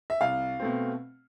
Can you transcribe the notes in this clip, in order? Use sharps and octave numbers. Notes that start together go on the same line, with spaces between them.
E5
C2 F5
B2 A3 C4